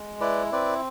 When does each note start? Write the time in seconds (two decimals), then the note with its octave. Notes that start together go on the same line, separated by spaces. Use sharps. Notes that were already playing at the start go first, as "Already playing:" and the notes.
Already playing: G#3
0.20 E4 B4 D5
0.52 C4 B4 D5